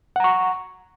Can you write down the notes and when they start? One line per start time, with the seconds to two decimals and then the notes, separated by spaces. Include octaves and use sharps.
0.16 F#5
0.20 A#5
0.24 C#6